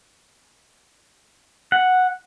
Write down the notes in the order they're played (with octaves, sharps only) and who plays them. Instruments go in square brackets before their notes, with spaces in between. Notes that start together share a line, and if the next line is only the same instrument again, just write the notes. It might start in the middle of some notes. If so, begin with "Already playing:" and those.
[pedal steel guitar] F#5